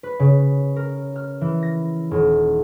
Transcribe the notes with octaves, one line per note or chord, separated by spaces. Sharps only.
B4
C#3
A#4
F6
E3
A#6
D#1